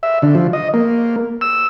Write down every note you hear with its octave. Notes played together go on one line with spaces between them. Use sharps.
E5
D3
F3
D#5
A#3
E6